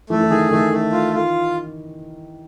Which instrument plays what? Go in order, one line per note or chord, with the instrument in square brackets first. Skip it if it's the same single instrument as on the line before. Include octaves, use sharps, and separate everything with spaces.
[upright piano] E3 [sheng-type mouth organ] A3
[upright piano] E3
[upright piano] D#3 [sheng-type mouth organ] G#4
[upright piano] D#3 [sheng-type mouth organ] A3
[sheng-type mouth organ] A3
F4
F4